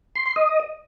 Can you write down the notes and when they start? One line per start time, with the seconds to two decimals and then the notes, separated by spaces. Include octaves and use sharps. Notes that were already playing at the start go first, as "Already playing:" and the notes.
0.15 C6
0.26 C6
0.36 D#5